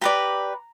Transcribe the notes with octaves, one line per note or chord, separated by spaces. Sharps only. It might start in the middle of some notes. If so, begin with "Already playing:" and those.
G4 B4 D5 A#5